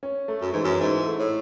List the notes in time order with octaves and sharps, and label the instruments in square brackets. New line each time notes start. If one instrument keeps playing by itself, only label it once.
[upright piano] C#4
A3
[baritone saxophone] F#2
[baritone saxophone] G#2 [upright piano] E3
[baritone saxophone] F#2
[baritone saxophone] G#2 [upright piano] E4
[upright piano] A3
[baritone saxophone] A2